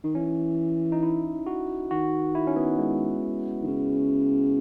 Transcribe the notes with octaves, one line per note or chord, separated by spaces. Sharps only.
D#3 D#4
E3 C#4
D#4
E4
F#4
D#3 F#4
E4
C#4
B3
G#3
D#3
C#3